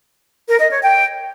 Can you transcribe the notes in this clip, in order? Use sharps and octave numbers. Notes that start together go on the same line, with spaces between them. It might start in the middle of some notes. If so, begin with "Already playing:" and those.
A#4
D#5
C#5
G5